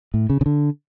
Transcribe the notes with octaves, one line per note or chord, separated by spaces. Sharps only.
A2
C#3
C#3
D3